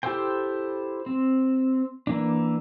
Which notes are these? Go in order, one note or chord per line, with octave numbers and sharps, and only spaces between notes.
E4 G4 A4 C5 G5
C4
E3 A#3 D4